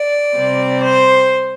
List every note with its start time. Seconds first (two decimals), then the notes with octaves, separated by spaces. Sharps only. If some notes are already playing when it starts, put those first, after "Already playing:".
Already playing: D5
0.35 C3 G3 C4
0.84 C5